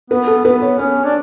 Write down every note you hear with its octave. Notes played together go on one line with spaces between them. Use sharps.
B3 B4
A4
B3 B4
C#5
C#4 C#5
D4